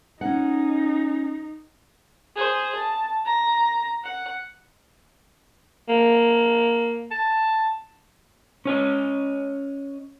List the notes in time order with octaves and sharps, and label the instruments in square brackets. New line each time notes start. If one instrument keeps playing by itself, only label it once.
[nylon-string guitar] C#4 F#5 [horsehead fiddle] D#4
[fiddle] G#4 C5
A5
A#5
F#5
[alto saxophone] A#3
A5
[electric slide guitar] C#4 C#5 D#5